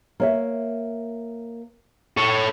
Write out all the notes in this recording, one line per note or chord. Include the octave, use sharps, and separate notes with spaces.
A#3 C#5 E5
A4 C#5